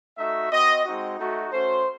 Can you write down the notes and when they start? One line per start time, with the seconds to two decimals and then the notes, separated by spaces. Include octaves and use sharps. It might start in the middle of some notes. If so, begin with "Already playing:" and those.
0.18 A3 D#4 F#4 E5
0.51 C4 F#4 D#5
0.85 G#3 C4 D#4 F#4
1.18 A3 D#4 F#4
1.52 A3 C#4 F#4 C5